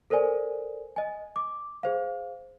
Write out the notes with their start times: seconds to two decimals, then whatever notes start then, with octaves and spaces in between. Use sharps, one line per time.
0.10 A4 A#4 C5 D5 G#5
0.96 D#5 G#5
1.36 D6
1.83 G#4 C5 F5